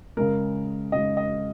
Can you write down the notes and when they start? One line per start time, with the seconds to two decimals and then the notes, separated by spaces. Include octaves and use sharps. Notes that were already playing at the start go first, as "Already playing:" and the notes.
0.17 C#3 G#3 A#4
0.92 C#3 G#3 D#5
1.17 D#5